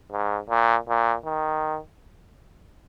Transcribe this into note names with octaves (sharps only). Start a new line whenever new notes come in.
G#2
A#2
A#2
D#3